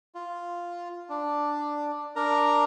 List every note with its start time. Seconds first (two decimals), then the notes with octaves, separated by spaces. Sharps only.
0.15 F4
1.09 D4
2.16 D4 A#4 A#5